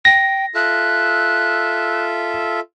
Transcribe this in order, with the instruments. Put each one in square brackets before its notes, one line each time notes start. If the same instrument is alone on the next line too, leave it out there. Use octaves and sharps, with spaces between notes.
[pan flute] G5 [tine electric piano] A#6
[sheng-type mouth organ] F4 A4 E5 [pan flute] F#6